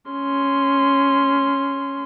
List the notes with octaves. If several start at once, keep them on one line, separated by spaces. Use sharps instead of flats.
C#4 C6